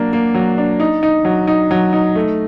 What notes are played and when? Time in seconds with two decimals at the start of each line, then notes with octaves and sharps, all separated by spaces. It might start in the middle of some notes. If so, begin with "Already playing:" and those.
Already playing: F#3 A#3 D4
0.13 A#3
0.34 F#3
0.58 D4
0.80 D#4
1.03 D#4
1.25 F#3
1.47 D#4
1.71 F#3
1.93 D#4
2.15 A3